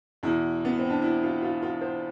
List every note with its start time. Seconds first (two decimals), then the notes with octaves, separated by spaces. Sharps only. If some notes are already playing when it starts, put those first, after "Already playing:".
0.23 E2 B2 E4
0.65 B3
0.78 C4
0.90 D4
1.02 E4
1.23 F4
1.42 F4
1.62 F4
1.81 C5